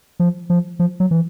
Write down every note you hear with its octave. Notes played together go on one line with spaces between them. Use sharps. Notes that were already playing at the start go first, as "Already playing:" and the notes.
F3
F3
F3
F#3
E3